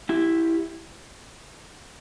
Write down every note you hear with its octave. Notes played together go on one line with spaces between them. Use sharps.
E4 G4